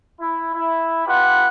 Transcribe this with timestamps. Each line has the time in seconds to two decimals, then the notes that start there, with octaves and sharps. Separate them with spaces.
0.20 E4
0.54 E4
1.07 F4 G4 B4 F#5